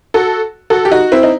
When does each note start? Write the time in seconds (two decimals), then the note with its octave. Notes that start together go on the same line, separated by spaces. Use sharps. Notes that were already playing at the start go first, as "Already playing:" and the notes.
0.14 F#4 A4
0.70 F#4 A4
0.85 G4
0.91 D#4 F#4
1.12 C4 E4
1.23 D#4